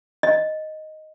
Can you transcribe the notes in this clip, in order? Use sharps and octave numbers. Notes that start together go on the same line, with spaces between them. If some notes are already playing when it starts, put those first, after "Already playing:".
D#5